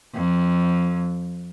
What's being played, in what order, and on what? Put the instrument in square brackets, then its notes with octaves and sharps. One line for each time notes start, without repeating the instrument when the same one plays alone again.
[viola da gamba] F2